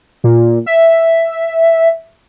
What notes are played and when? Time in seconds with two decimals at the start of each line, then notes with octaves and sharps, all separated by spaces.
0.24 A#2
0.66 E5